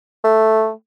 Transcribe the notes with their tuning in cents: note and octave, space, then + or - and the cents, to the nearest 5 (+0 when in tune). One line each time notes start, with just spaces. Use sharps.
A3 +0